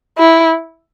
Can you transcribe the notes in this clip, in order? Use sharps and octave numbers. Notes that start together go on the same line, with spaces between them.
E4